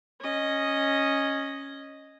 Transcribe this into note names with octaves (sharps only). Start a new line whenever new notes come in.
C#4 D#5